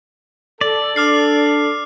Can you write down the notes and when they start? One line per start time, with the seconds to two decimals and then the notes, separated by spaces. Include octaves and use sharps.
0.61 A4 D5
0.96 D4 A4 D6 F6 C7